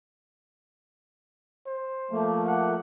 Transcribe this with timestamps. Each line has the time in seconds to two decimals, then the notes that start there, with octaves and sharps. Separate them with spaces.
1.66 C5
2.11 F3 A3 A#3
2.47 F#5